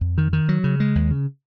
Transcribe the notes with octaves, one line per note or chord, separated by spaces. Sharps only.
F2
D#3
D#3
F#3
C#3
G#3
D#2
C#3